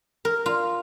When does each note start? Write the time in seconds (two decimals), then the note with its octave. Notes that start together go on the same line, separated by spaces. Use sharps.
0.25 A#4
0.46 F4